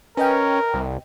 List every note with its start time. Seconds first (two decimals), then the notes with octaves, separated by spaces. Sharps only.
0.17 C#4 A#4 B4 D#5 G5
0.74 C2